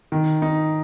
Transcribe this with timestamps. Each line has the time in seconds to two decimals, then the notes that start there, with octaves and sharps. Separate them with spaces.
0.12 D#3
0.42 D#4